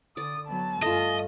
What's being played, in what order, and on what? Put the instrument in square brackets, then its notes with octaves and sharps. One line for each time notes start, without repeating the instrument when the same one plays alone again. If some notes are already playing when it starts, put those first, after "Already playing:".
[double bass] D3 [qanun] D5 [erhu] D#6
[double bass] F#3 B3 [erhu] A5
[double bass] G2 [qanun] A3 F4 [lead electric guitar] D#5